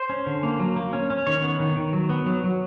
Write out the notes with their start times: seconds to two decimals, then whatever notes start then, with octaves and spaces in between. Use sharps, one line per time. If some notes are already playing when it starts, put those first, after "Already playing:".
Already playing: C5
0.10 C#4
0.27 D3
0.43 A#3
0.60 F#3
0.76 A#3
0.93 C#4
1.10 C#4
1.27 D#3 C#5
1.43 B3
1.60 D#3
1.76 D#3
1.93 F#3
2.09 B3
2.26 F#3
2.44 F#3